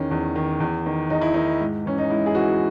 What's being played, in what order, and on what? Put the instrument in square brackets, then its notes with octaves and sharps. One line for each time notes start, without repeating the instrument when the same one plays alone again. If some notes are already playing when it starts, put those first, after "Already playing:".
Already playing: [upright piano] E2 D#3 C#4
E2
D#3
E2
D#3
E2 D#4
E4
D#3 D#4
G#2
E3 C#4
D#4
G#2 E4
G#4
E3 F#4